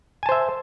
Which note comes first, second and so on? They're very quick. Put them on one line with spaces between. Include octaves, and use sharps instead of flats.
G#5 A5 C5 E5